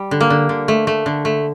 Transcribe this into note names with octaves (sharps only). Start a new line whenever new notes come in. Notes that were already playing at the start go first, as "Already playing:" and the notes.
Already playing: G3
D3
A#3
D3
D3
A3
A3
D3
A3